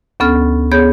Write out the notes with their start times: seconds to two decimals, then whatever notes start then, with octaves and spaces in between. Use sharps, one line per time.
0.20 D2 B3 C#4 A4 F6
0.71 B3 G#4 C#5 G6